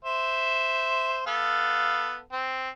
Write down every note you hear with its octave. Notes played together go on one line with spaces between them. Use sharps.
C5 E5
B3 A4 F5
C4